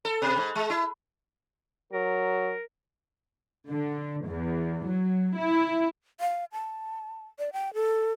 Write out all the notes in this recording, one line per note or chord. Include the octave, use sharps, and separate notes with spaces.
A4
B2
G#2
G#3
E4
F#3 A#4
D3
E2
F#3
E4
F5
A5
D5
G5
A4